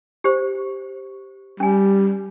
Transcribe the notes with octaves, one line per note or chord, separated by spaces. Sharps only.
G4 C5
G3 C#4 G#5